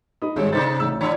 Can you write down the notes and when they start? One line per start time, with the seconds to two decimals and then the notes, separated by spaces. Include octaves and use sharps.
0.22 D#4 B5 D#6
0.36 G#1 G2 F3 G#3 C#5
0.52 C3 D#4 A4 C5 A6
0.80 A1 E6
1.01 E3 D4 C#5 B5